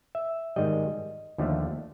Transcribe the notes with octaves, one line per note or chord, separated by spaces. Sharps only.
E5
G#2 D#3 G3 D#5
D#2 D3 F3 A3